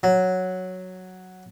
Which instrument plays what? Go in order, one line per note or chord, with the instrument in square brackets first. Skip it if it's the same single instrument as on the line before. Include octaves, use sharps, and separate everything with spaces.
[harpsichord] F#3